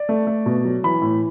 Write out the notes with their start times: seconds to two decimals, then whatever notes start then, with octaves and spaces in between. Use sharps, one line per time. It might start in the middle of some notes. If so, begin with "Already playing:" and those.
Already playing: D5
0.09 A3
0.27 A3
0.46 B2
0.64 F#3
0.84 E3 B5
1.02 A2